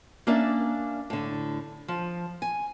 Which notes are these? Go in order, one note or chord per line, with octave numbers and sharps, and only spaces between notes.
A#3 C#4 D4 A#4 D5 E5
A2 D3
F3
G#5